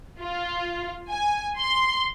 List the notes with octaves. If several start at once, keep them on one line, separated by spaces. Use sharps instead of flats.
F4
G#5
C6